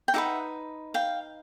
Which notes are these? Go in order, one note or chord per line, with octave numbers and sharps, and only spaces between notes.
G5
D#4 G4 B4 E5 F#5
F5 G5